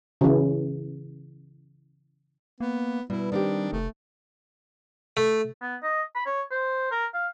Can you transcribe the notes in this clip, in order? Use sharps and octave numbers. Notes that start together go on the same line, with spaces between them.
C#3 E3
A#3 B3
B2 G3 E4
D#3 C4 D4 G4
F1 A3
A3
B3
D#5
B5
C#5
C5
A#4
F5